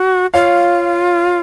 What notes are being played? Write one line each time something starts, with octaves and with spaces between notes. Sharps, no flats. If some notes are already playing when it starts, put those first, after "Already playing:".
Already playing: F#4
F4 C#5 F5